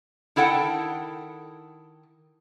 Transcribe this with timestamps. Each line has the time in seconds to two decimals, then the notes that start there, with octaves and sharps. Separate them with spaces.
0.36 D#3 E4 A4 F#5 G5